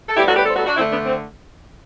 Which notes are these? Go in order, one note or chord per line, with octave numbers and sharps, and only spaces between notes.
A4
A2 G3 B3 E4 G4
F#4 A4
G4 B4
A4 C5
F#4 A4
D4 F#4
D3 A3 C4 E4
B3 D4
C4